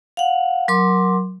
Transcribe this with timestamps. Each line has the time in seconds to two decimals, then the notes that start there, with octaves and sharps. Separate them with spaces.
0.17 F5 F#5
0.68 F#3 A#4 C6 D6